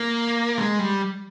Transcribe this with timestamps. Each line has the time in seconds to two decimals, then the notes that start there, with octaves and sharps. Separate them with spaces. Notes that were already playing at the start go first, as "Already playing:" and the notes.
Already playing: A#3
0.58 G#3
0.79 G3